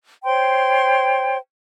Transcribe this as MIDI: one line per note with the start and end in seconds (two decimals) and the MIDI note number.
0.24 1.37 72
0.24 1.37 73
0.24 1.37 79
0.24 1.37 84